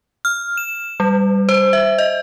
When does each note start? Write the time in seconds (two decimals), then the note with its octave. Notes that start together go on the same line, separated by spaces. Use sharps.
0.25 F6
0.57 E7
1.00 G3
1.49 C5
1.73 E5
1.98 D#5